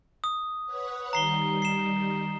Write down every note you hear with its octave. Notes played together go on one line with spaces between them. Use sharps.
D#6
B4 C#5 F#5
D#3 G3 A#5 C7 G7
C7 E7